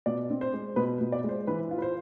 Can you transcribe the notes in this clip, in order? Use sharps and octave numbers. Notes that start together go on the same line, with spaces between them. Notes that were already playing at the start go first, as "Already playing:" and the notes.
B2 D5
C4
C5
G#3
B2 B4
B2
D5
G#3
C5
E3 B4
F4
B4
C5